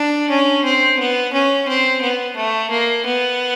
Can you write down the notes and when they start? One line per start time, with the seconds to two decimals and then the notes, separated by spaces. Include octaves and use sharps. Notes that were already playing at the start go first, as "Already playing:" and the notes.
Already playing: D4
0.30 C#4
0.64 C4
0.99 B3
1.33 C#4
1.68 C4
2.02 B3
2.37 A3
2.71 A#3
3.06 B3